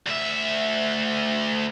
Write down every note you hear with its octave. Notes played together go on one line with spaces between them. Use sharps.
D2 E5